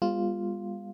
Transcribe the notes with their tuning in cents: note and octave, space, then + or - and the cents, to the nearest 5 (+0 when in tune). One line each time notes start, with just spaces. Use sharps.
G3 +45 B3 -20 F4 +0